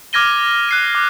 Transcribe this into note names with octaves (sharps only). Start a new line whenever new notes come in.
D6 F6 G#6 A#6 D#7 G7
F#6 C7 D#7
D6